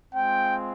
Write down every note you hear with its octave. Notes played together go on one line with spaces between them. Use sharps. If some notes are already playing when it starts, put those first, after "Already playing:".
G#3 C4 F4 G5